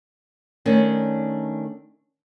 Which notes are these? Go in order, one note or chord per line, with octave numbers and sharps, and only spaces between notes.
D#3 A3 C#4 D4